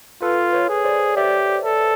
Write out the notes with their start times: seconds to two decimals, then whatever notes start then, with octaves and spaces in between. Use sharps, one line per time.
0.22 F4 A4 B4
0.53 B4 C#5
0.69 G#4
0.85 C5 D5
1.16 G4 D5 E5
1.64 A4